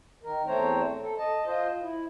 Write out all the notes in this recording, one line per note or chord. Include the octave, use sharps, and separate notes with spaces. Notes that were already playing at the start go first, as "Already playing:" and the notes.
D#3 A#4
E2 A3 C4 C5 C#5 A#5
A4
D#5 A5
F4 C5 D#5
E4